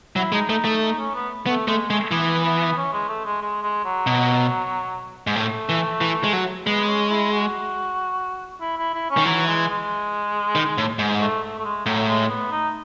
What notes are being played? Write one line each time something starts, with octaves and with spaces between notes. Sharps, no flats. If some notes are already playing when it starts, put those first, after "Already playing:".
F#3 E4
G#3 D#4
A3 D#4
A3 D#4
D#4
C#4
B3
A3 B3
G#3 A3
G#3 A3
E3 B3
B3
C#4
G#3
A3
G#3
G#3
G#3
F#3
B2
G#2
A2 A3
E3
E3
G#3
F#3
G#3 B3
C#4
E4
F#4
E4
E4
E4
C#4
D#3
E3 F#3
G#3
G#3
D#3
A2
G#2
A3
A3
A3
G#3
A2 F#3
G#3
B3
D#4